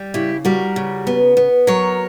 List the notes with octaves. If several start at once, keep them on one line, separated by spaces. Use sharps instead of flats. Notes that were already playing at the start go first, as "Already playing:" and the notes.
Already playing: G3
C#3 E4 G4
G3 F#4 A#4
C#3
B3
B3
F#3 A#4 C#5